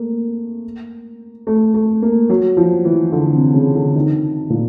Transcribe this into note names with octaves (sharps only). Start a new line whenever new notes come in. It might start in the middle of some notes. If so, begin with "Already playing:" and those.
Already playing: A3 A#3
A3
A3
A#3
F#3
F3
E3
D3
C3
C#3
D3
D#3
A#2